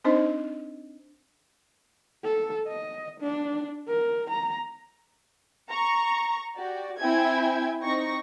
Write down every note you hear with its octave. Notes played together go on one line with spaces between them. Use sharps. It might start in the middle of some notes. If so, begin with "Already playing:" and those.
C4 D4 D#4 C5 D#5
A4
D#5
D4
A#4
A#5
A#5 C#6
F#4 G4 D5
C4 E4 E5 G5 G#5 G#6
C4 D#4 C#6 A#6